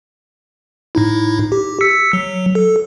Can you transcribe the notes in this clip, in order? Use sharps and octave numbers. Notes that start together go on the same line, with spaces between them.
A2 D#4 E4
G4
E6 B6 C#7
F#3
A4